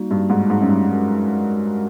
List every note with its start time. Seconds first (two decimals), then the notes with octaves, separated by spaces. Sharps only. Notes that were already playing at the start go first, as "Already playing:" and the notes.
Already playing: G3 A#3 D#4 F#4
0.11 G2
0.30 G#2
0.50 G#2
0.62 F#2
0.69 G2
0.88 G#3 C#4 F#4 A#4